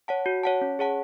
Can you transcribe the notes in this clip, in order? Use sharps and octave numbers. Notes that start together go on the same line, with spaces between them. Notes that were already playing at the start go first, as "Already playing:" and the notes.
C#5 F#5 A5
F#4
C#5 F#5 A5
C#4
G#4 C#5 F#5 A5